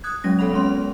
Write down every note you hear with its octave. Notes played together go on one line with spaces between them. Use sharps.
D#6 F#6 G#6
F#3 G#3 C#4 A#6
B3 A4 C#5 F#5 B5 F7
G#3 C4 C#4 C6